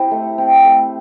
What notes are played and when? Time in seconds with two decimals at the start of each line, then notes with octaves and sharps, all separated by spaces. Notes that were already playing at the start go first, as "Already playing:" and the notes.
Already playing: C4 E4 G4 C5
0.11 A3
0.38 C4
0.65 A3